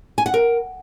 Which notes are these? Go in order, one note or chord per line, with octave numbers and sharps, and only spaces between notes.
G#5
F#5
A#4